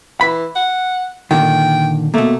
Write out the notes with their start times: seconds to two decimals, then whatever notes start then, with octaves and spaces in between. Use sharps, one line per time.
0.21 E3 B5
0.55 F#5
1.31 A#2 D3 D#3 G5
2.14 B2 A3 A#3